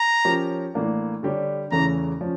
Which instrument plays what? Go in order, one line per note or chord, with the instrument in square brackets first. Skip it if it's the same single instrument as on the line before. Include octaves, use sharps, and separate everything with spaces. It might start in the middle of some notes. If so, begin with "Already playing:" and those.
Already playing: [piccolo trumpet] A#5
[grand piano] F3 C#4 G4 A#4 C#5
A2 E3 A#3 D4
D3 G3 D4 G4 C#5
[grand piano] E2 C#3 E3 A3 C#4 [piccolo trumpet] A#5
[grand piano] F3 C#4